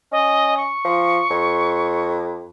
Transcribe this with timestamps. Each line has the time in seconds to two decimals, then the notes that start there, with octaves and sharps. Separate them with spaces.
0.12 C#4 D#5
0.57 C#6
0.85 F3
1.30 F2